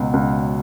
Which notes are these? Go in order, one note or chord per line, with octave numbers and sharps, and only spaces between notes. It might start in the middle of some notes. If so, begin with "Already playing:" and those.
Already playing: C#2 B2 F#3
C#2